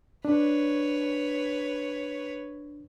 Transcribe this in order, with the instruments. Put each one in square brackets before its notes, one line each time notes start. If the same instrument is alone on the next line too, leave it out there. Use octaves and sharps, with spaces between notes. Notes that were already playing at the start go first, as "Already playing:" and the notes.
[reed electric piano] D4 [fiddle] B4 C#5